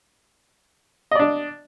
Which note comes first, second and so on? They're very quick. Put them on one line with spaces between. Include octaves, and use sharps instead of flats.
D#5 D5 D4